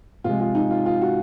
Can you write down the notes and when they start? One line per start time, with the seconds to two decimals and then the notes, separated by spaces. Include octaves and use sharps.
0.24 C3 F3 G#3 F4
0.40 F4
0.55 D#4
0.70 F4
0.86 F4
1.01 F#4